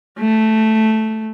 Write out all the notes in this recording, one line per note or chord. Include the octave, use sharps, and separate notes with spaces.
A3